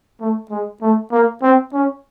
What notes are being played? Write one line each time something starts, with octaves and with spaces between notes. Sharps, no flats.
A3
G#3
A3
A#3
C4
C#4